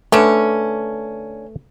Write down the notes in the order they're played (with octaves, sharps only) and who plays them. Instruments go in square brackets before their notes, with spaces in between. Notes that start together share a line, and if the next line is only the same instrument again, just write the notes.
[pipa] D3 C#4 [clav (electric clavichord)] A3 B4